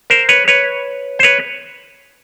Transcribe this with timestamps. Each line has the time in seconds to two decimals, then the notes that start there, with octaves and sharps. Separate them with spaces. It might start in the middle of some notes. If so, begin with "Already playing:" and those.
0.10 A#4 C5
0.29 B4 C#5
0.48 B4 C#5
1.19 C5
1.23 B4 C#5